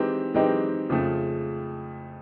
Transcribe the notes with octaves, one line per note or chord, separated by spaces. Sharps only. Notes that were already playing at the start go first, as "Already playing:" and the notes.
Already playing: E3 G#3 C4 D#4 G4
E3 G#3 C4 D#4 G4
F2 C#3 F3 A3